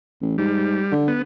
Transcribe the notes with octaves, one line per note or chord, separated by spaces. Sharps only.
A1
G#2 G3
D3
B3